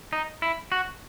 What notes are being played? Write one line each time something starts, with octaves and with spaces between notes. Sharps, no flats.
D#4
E4
F#4